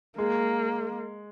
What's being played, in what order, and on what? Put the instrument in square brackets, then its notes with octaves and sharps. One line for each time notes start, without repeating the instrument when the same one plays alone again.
[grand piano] G#3 [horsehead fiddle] A#3